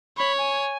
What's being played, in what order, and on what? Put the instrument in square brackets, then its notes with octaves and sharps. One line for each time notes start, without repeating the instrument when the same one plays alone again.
[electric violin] C#5 [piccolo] B5
[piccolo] G#5